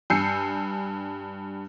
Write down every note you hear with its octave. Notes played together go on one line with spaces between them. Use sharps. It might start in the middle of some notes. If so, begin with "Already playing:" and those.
G2 G#5 E6 G6 C7 C#7